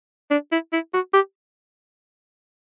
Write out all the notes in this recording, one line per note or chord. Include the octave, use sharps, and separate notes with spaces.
D4
E4
E4
F#4
G4